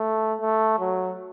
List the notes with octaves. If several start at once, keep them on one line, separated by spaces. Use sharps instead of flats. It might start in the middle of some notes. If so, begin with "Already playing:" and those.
Already playing: A3
A3
F#3